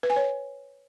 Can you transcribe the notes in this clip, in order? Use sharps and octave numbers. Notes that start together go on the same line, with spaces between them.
B4
G#5
C#5